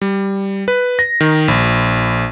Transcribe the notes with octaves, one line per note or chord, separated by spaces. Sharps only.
G3
B4
A#6
D#3
A#1